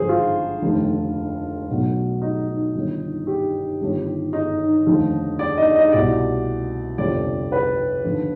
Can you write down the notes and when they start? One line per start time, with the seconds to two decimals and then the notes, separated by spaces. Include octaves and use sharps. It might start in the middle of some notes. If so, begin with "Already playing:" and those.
Already playing: G#1 G2 D3 F3 G#4 C5
0.09 F4
0.62 F1 D#2 D3
1.69 B1 B2
2.22 D#4
2.75 G1 G2 D#3
3.27 G4
3.80 G1 G2 D#3
4.33 D#4
4.86 F1 D#2 D3 F3
5.39 D5
5.57 D#5
5.75 D#5
5.92 C2 B2 D5
6.98 G1 F2 C3 F3 D5
7.52 B4
8.04 D#2 D3 F3